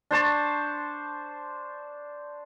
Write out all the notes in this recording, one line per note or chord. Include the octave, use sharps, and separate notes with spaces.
D4 C5 A5 C#6